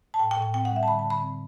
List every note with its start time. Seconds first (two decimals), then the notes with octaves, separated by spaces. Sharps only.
0.14 A5
0.19 A2 G5
0.31 G5
0.37 A2
0.42 G5
0.54 C4 G5
0.65 F#5
0.71 G3
0.76 E5
0.83 A5
0.88 D3 B5
0.99 A5
1.05 D3
1.10 B5
1.22 C4